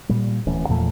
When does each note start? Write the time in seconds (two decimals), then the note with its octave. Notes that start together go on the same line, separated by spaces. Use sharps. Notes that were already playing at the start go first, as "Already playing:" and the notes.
0.09 A#2 G3
0.47 D1 E3 A3 C#4
0.69 E2 A#2 F3 A3